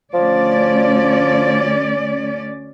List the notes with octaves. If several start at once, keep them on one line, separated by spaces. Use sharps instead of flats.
D2 F3 C#4 D5